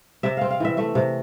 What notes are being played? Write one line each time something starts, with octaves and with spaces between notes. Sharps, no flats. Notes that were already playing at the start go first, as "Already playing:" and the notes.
C3 E5
C4 F5
F5
E3 E5
A3 E5
C3